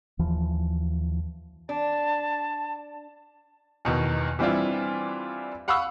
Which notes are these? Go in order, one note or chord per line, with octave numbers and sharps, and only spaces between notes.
D#2 E3 F3
D4 A5
E2 B2 D#3
E3 G3 C4 D4 E4 F4
F5 F#5 B5 C#6 D#6 E6